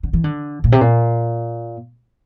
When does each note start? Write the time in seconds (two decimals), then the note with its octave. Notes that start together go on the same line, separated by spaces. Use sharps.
0.03 D3
0.13 E3
0.24 D3
0.64 A#2
0.72 C3
0.81 A#2